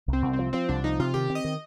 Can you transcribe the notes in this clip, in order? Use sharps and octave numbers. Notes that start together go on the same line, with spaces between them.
C2
C4
C2
C4
F3
F3 C4
C2 D4
F3 D#4
C3 F4
D#3 G4
C4
D#5
D#3